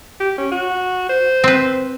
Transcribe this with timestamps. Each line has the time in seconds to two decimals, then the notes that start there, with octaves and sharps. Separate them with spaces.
0.20 G4
0.38 C#4
0.52 F#4
1.09 C5
1.44 C4 B4